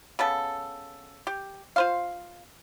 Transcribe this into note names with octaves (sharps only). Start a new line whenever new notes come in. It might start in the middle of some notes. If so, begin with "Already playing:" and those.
C#3 B3 A4
G4
F4 C5 F5